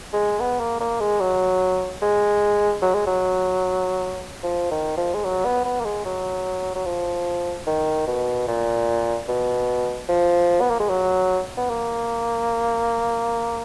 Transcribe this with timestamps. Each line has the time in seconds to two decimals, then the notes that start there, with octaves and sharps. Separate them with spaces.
0.13 G#3
0.40 B3
0.60 A#3
0.80 A#3
1.00 G#3
1.21 F#3
2.02 G#3
2.82 F#3
2.94 G#3
3.07 F#3
4.43 F3
4.71 D#3
4.97 F3
5.14 G#3
5.24 F#3
5.45 B3
5.65 B3
5.80 A#3
5.85 G#3
6.05 F#3
6.75 F#3
6.85 F3
7.67 D#3
8.07 B2
8.47 A#2
9.28 B2
10.08 F3
10.61 B3
10.70 A#3
10.79 G#3
10.89 F#3
11.57 B3
11.70 A#3